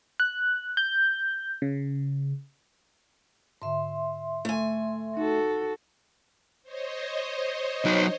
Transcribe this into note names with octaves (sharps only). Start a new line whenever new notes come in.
F#6
G6
C#3
G#2 D3 E5 C6
A3 G#5
D#4 F#4 A4
C5 C#5 D#5
F#3 D#4